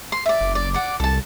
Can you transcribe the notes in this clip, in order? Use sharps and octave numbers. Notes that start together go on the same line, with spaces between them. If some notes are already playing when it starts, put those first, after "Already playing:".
C6
D5 E5
F#1
D5
D5 F#5
C2 A4 A5